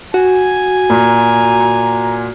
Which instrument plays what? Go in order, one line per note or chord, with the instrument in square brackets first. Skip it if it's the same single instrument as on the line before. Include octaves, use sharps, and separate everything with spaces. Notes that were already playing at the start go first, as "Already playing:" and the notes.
[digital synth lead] F#4 [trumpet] G#5
[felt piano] A#2 [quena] A#5